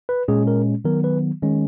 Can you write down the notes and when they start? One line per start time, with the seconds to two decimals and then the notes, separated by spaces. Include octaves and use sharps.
0.09 B4
0.28 A#2 G#3 C#4 G#4
0.47 A#4
0.85 D#3 F#3 B3 A#4
1.04 B4
1.42 D#3 G#3 C#4